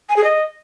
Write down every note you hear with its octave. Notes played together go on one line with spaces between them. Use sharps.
G#5
G#4
D#5